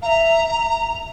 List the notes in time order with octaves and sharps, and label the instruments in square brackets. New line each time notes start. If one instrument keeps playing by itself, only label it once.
[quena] E5 F5 [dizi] A#5